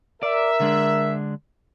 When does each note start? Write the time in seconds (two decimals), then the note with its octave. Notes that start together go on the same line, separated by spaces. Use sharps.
0.23 A#4 D5 E5
0.60 D3 G#3 D4